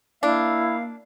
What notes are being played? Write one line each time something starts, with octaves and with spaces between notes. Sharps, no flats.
A#3 D4 E4 F5